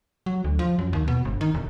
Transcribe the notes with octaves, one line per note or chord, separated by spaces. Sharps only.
F#3
D2
F3
F#2
D#2
B2
G1
D#3
E1